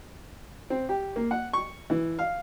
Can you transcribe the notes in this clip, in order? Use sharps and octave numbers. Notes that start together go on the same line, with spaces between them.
C4
G4
A#3
F#5
C#6
E3
F5